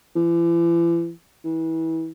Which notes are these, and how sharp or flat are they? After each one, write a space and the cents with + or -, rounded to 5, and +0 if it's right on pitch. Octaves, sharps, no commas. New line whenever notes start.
E3 +40
E3 -25